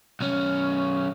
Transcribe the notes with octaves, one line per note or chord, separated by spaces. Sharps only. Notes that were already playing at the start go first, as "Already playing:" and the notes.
B1 C#4